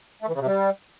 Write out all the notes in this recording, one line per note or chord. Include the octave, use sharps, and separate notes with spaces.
A3
E3
C#3
C3
G3